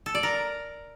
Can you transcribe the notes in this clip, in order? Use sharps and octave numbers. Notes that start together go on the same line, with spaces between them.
A4
D5
A#4